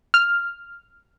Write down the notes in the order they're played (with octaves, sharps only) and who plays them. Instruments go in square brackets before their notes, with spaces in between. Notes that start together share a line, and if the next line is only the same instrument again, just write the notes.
[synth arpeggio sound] F6